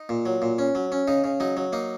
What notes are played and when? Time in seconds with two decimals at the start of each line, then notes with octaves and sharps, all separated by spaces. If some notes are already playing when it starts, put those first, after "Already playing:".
Already playing: D#4
0.09 A#2
0.26 F#3
0.42 A#2
0.59 C#4
0.75 F#3
0.92 C#4
1.08 C#3 D#4
1.24 C#3
1.40 F#3 D#4
1.57 F#3
1.73 A#3 D#4